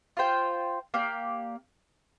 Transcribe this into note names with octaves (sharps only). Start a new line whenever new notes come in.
F4 C5 G5
A#3 G4 D5